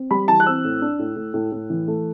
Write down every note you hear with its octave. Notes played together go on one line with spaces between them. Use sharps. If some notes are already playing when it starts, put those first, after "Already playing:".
Already playing: C4
G3 B5
E3 A5
F#6
C4 E6
A2
D4
A2
A2
A2
A2
E3
A3